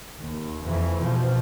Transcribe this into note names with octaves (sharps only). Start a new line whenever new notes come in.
D#2
F2 E3
B2 F3